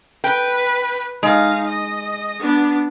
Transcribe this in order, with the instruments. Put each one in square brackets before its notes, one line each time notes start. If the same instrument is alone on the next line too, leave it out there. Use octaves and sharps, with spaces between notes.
[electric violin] B4 [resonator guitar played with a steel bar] G5
[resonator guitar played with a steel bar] G#3 [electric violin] D#4 F5
[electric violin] D#5
B3 D4